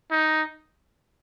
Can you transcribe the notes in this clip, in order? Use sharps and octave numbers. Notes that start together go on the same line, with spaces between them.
D#4